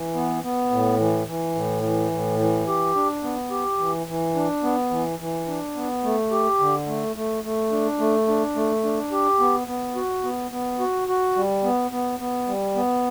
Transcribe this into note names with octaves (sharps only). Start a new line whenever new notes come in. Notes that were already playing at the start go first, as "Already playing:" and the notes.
Already playing: E3
B3
B3
A2
E3
E3
A2
E3
A2
E3
G4
D4
B3
G4
E3
E3
D4
B3
E3
E3
D4
B3
A3
G4
D3
A3
A3
A3
D4
A3
D4
A3
D4
G4
B3
B3
F#4
B3
B3
F#4
F#4
G3
B3
B3
B3
G3
B3